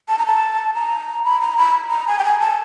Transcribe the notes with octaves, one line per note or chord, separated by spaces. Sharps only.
A5
A#5
A5
A#5
B5
A#5
B5
A#5
G#5
G5
G#5
A5